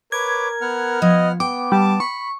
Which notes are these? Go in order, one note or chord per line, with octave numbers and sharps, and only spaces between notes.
A#4 B4 C#5 D6 G#6
B3 F#5 F6
F3 D#5
B3 G5 D6
G3 A5 D6
B5 C#6